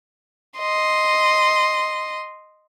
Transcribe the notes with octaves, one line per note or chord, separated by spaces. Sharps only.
D#5 C6